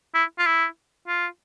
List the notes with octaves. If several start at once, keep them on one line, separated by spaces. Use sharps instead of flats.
E4
F4
E4
F4